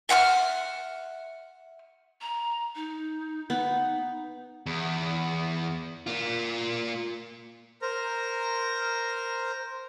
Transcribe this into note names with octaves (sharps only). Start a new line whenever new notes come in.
E5 F#5 E6 F6
A#5
D#4
B3 D#4
E2
A#3 F4
A#4 C5 A#5